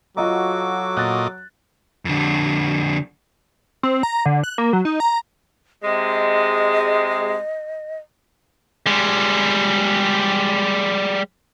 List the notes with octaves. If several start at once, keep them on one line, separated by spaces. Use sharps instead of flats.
F#3 F4 F#4 A4 D#5 A#5 D6
A#2 D#5 F#6 A6
F2 D3
C4
A#5
D3
F#6
A#3
F#3
D#4
A#5
C3 G#3 D#5
G3 G#3